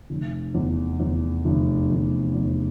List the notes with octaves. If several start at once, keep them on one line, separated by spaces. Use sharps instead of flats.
F1
E2
E2
F1
F1
E2